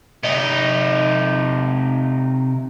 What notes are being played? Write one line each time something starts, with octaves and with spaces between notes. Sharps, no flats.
C3 D#4